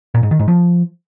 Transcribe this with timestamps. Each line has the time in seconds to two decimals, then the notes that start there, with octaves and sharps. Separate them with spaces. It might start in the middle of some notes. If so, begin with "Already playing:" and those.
0.14 A#2
0.23 G#2
0.31 D#3
0.39 G#2
0.48 F3